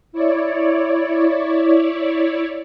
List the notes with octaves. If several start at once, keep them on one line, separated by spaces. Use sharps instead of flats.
E4 C#5 D5